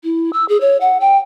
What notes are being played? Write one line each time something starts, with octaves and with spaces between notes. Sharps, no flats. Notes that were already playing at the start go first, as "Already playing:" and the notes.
E4
E6
G#4
C#5
F#5
G5